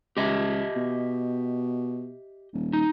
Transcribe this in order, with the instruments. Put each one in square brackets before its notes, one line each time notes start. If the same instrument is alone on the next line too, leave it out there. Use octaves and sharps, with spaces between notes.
[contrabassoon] C#2 [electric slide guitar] G4 D#5 E5
[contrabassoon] B2
D#1
[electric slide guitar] D#4